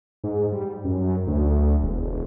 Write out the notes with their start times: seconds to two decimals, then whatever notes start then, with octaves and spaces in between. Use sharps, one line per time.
0.24 G#2
0.52 G3
0.84 F#2
1.27 D2
1.82 E1